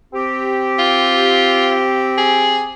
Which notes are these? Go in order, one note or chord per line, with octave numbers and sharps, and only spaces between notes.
C4 G4
F4
G#4